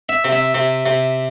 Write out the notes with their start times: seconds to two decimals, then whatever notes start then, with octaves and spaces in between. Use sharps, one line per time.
0.09 E5
0.24 C3
0.32 E5
0.55 C3
0.86 C3